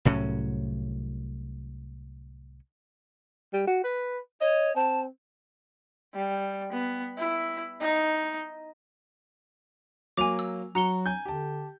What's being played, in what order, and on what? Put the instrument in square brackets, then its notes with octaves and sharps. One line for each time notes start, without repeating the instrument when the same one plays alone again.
[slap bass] C2 A2 F#3 C#4
[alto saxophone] G3
F#4
B4
[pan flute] C#5 [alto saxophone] D#5
[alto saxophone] C4 [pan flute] A5
[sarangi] G3
B3
E4
D#4
[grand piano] F#3 A#3 F7 [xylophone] G#5 D6
[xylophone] E6
[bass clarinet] F#3 [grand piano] F#4 [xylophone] A#5 C#7 G7
[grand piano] G#5 G6
[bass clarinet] D3 [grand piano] G4 A5